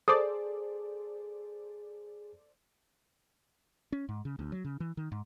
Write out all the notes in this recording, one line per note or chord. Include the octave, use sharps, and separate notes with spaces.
G#4 A4 C5 D5 D6 D#6
C#4
G#2
C#3
D2
F#3
C#3
E3
D#3
G#2